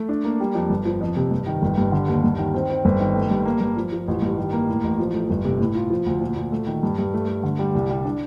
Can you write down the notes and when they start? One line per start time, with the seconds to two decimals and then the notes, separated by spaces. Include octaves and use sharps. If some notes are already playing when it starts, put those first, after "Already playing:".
Already playing: A3
0.09 D4
0.24 A#3
0.40 G3
0.55 F2
0.70 G1
0.86 F3
1.01 F2
1.16 C3
1.31 G2
1.47 D#3
1.62 G1
1.78 G2
1.92 D3
2.08 D#2
2.24 G2
2.38 D#3
2.54 C4
2.70 C4
2.85 G1
3.00 D#3
3.16 A3
3.31 G2
3.45 A#3
3.61 G2
3.77 F3
3.92 F3
4.08 A1
4.22 G2
4.37 D#3
4.53 A#3
4.68 A2
4.84 A1
4.99 F3
5.14 A3
5.30 G1
5.44 C3
5.60 A2
5.75 F4
5.90 F3
6.06 D2
6.21 A#2
6.36 A#2
6.52 A3
6.67 D#3
6.83 G2
6.98 G2
7.14 A3
7.29 A3
7.43 D3
7.59 G3
7.75 C2
7.90 G3
8.05 D4